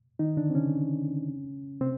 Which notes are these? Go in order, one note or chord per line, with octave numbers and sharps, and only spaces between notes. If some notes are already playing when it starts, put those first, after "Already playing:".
D#3 D#4
D3 D4
C4
C#3 C#4
C3 C4